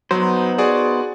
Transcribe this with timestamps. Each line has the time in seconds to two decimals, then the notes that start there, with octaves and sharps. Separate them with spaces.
0.11 F#3 B3 D#4 C5
0.58 F#4 G#4 D5